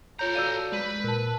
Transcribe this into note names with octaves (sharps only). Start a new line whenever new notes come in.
F4 A4 C#5 A#5 G6
F#4 D5 F5 E6 G6 D#7
G#3 B4 B5
A#2 A#4 A5